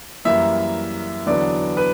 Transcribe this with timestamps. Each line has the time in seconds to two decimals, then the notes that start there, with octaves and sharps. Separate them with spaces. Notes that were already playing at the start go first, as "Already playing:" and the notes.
0.25 F#2 E3 G3 A#3 E5
1.26 E2 D3 F#3 B3 D4 D5
1.77 B4